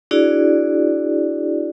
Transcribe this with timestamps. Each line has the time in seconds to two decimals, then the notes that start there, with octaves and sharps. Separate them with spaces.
0.11 D4 E4 F#4 G#4 D5